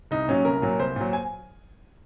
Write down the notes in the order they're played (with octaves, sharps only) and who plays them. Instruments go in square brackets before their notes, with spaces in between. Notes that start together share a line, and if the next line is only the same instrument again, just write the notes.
[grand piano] C2 D#4
A#2 F#3 C#4
C2 A#4
A#2 F#3
C2 C5
A#2 F#3
G#5